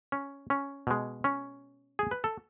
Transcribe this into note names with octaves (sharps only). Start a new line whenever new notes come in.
C#4
C#4
B2 G#3
C#4
G#4
B4
A4